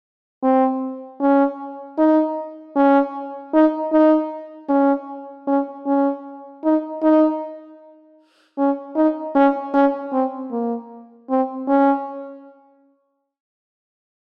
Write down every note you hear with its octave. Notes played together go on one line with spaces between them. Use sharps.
C4
C#4
D#4
C#4
D#4
D#4
C#4
C#4
C#4
D#4
D#4
C#4
D#4
C#4
C#4
C4
A#3
C4
C#4